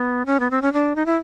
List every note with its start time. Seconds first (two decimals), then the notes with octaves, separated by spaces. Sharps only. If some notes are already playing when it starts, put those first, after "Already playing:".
Already playing: B3
0.26 C#4
0.40 B3
0.51 C4
0.62 C#4
0.73 D4
0.96 D#4
1.06 E4